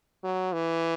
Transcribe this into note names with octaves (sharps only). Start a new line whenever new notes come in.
F#3
E3